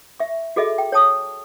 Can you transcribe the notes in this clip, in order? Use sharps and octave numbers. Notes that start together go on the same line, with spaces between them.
E5 C#6
F#4 G#4 A4 D#5 E5
G5
C#5 G5 A5 D#6